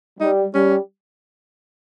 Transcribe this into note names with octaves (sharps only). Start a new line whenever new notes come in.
G3 D#4
G3 C#4